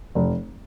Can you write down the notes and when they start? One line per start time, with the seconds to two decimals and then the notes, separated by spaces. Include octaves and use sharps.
0.15 F1